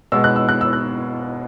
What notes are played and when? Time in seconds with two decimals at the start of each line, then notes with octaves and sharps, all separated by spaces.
0.12 B2 G#3 B3 E6
0.24 F#6
0.36 E6
0.49 F#6
0.61 E6
0.73 F#6